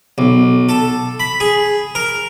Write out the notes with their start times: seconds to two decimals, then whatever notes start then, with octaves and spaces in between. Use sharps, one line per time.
0.18 B1
0.69 A4
1.20 B5
1.40 G#4
1.95 A#4